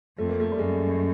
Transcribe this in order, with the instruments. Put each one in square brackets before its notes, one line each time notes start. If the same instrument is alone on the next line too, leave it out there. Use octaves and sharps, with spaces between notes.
[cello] F2 [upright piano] A3
[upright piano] A#3
A3
G3
[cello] F#2 [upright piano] G#3